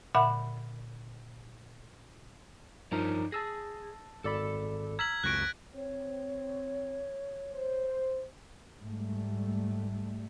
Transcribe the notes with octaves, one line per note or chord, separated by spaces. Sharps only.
A#2 D3 E5 F#5 B5
G2 F3 D#4 A#4 C#5 D5
G#4 A5 E6 A#6
G#1 A4 D5 B5
A#5 E6 F6 G#6 B6 F#7
C#2 F#2 C4 C#6 F#6 A#6 D7
C4 C#5
C5
G#2 G3 A3